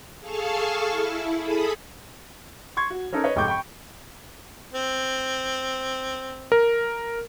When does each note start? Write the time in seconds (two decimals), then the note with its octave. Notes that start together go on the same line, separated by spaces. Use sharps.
0.20 G#4 A4 F5 A5 C#6 F6
0.89 E4
1.37 G#4 A4 B5 D#6
2.77 C6 C#6 G#6
2.90 F#4
3.13 C#4 D#4 A4 A#4
3.24 B4 C#5 D#5
3.36 F1 G#2 G5 C#6 D6 G6
3.48 G5 B5 C#6
4.74 C4
6.52 A#4